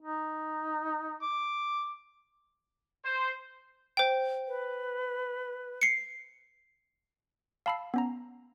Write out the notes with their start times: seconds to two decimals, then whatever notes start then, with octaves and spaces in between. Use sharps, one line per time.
0.02 D#4
1.23 D6
3.04 C5
3.97 C5 G5
4.48 B4
5.81 C7 C#7
7.66 F5 A5 B5 E6 C7
7.94 B3 C#4 A#5